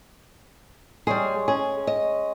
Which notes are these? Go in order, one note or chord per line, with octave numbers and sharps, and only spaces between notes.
G3 G#3 G#4 C#5
C#4 G#4
D#5